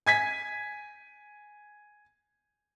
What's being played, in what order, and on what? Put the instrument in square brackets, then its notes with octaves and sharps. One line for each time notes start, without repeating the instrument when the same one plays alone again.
[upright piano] G#5 G#6 B6